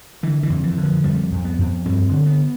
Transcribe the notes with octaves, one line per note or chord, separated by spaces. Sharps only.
D3 E3
E3
F2
E3
D3
F3
F2 G3
F2
B3
F2
G2 C4
D3
B3